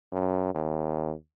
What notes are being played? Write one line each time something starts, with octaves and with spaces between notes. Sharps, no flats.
F#2
D#2